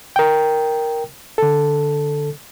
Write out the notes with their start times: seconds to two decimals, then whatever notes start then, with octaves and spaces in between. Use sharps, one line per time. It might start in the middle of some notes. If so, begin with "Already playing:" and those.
0.16 A#4 G5
1.38 D3 A4